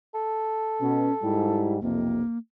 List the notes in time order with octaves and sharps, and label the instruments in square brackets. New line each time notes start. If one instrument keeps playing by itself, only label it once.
[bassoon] A4
[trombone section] B2 [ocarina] C#4
[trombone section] G#2 G3 [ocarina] E4
[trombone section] B1 F2 C3 [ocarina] A#3